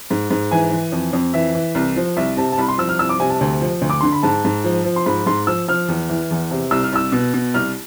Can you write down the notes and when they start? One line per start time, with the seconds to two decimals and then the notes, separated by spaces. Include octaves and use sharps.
0.11 G#2
0.31 G#2
0.51 E3 G#5
0.71 E3
0.92 F2
1.13 F2
1.34 E3 E5
1.55 E3
1.75 C2
1.96 F3
2.17 C2 E5
2.37 C3 A5
2.52 A5
2.58 C2 B5
2.68 C6
2.78 F3 E6
2.89 F6
2.99 C2 E6
3.09 D6
3.20 C3 G#5
3.30 A5
3.41 D2
3.62 F3
3.81 D2
3.90 D6
4.01 D3 C6
4.12 B5
4.23 G#2 A5
4.45 G#2
4.64 F3
4.85 F3
4.96 C6
5.06 G#2 B5
5.26 G#2 C6
5.47 F3 E6
5.68 F3 F6
5.88 E2
6.10 E3
6.31 E2
6.51 C3
6.71 C2 E6
6.83 F6
6.92 C2 E6
7.12 B2
7.34 B2
7.54 C2 F6